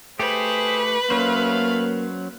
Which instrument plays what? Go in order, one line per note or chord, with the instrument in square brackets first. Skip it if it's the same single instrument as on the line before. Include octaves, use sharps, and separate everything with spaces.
[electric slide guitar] A3 G4 [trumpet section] G#4 C5 [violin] B4
[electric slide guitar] F#3 C#4 C5 [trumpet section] A3 F5 [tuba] A#3